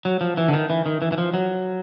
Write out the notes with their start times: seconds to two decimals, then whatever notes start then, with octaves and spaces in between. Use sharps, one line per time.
0.05 F#3
0.21 F3
0.37 E3
0.48 D3
0.53 D#3
0.70 E3
0.86 D#3
1.02 E3
1.12 E3
1.18 F3
1.34 F#3